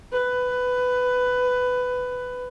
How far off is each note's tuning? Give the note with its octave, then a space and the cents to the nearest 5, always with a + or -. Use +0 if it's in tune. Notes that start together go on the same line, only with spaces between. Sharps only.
B4 +15